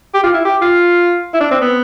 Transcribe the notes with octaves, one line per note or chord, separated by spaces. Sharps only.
G4
F4
E4
G4
F4
E4
D4
C4
B3